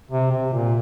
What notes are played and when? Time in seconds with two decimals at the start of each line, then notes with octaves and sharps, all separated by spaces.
0.11 C3
0.32 C3
0.53 A#2